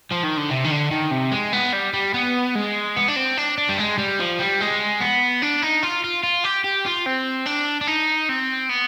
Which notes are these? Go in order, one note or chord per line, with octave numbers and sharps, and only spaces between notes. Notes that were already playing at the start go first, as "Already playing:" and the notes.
F3
D#3
D3
C3
D#3
D3
D#3
C3
G#3
B3
G3
G3
B3
G#3
B3
D4
C4
D4
D4
G3
G#3
G3
F3
G3
G#3
B3
D4
D#4
F4
F4
F4
G4
G4
F4
C4
D4
D4
D#4
C4
B3